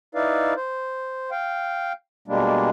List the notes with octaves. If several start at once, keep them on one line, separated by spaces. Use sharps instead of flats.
D#4 E4 B4 D5 F5
C5
F5 G5
B2 G3 G#3 A#3 D4